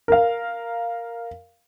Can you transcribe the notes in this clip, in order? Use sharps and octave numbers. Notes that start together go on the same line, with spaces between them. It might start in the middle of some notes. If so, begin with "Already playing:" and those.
A#4 F5